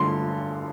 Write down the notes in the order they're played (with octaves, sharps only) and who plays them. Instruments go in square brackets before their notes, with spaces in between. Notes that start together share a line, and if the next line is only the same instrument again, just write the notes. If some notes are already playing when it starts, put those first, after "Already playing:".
Already playing: [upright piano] G2 D3 A3 C6